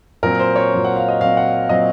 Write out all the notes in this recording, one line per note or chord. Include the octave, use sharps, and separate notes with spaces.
A#2 F#3 C4 A#4
C5
C#5
A#2 F#3 C4
F#5
F5
D#5
A#2 F#3 C4 F5
F#5
A#2 F#3 C4 D#5